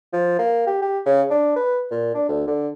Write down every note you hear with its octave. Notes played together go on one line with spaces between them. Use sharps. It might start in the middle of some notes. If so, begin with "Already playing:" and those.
F3
A#3
G4
G4
C#3
D4
B4
A#2
D4
D2
D3